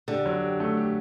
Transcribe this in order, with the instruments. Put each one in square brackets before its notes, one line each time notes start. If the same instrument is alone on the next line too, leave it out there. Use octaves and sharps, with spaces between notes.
[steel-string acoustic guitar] D3 [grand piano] G4
[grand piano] F#3
G4
A3
G4